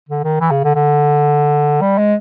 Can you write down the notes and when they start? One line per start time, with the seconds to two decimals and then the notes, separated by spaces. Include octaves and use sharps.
0.09 D3
0.24 D#3
0.41 E3
0.51 C#3
0.64 D3
0.75 D3
1.82 G3
1.98 G#3